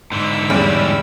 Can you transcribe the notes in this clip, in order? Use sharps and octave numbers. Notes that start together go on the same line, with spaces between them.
G#2 D3 B5 D6 E6
E2 G3 G#3 C#4